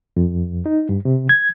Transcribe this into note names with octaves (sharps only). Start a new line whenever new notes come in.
F2
D#4
G2
C3
G#6